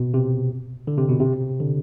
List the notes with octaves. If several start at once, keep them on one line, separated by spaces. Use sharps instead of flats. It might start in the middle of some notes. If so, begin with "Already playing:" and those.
Already playing: B2
C3
D3
C3
B2
C3
D3